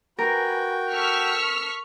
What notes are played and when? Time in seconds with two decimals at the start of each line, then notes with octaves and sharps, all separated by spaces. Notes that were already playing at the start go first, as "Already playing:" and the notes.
0.19 F#4 A#4 B4 G5 G#5
0.92 A4 C#6 E6 F6 B6